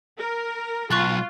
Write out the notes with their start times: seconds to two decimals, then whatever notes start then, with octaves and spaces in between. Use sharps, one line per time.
0.19 A#4
0.91 B1 F4 C#6 F#6 A6